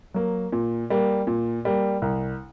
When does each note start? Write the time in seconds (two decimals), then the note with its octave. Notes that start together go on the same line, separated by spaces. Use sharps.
0.14 F#3 A#3
0.52 A#2
0.90 G3 A#3
1.27 A#2
1.65 G3 A#3
2.02 C2